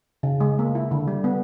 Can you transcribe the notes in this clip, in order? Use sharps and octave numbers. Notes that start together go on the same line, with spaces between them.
C#3
G#3
A#3
E4
D3
G3
B3